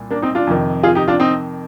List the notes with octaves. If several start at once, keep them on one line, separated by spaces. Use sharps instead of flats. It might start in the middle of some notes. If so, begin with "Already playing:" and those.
Already playing: C2 A#2
A#3 D4
C4 D#4
D4 F4
F2 C3 D#3
F4 G#4
D#4 G4
D4 F4
C4 D#4